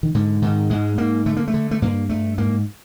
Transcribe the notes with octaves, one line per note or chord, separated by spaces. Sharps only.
D#3
G#2 D3
G#2 D#3
G#2 G#3
G#2 A#3
D3 A3
A#3
A3
D3
A3
G2 A#3
G2 A3
G#2 A#3